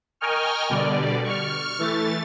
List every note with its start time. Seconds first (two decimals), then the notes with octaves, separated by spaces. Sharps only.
0.21 A#4 D#5 G5 G#5 C#6 F6
0.69 B2 D3 G3 D5
1.24 C#6 F6
1.79 E3 A3 A6